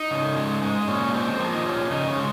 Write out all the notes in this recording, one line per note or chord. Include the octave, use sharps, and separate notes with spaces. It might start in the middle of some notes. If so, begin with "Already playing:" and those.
Already playing: D#4
C#3
G#3
G#3
A#2 C#4
G#3 C4
F3 A#3
D#4
A#2 C#4
C#3 D#4
C#4
G#3